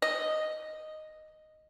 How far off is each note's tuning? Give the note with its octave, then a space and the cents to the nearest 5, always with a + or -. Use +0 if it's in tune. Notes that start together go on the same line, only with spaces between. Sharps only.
D#5 -5